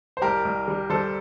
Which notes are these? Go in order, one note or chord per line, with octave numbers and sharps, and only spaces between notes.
C5
C2 G4 A#4
C2
G3
G3 A4 C5